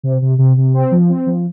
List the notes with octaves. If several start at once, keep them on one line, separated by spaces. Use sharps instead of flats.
C3
C3
C3
C3
C4
F3
C4
F3